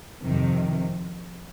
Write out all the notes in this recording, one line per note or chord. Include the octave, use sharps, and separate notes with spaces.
F2 C3 D#3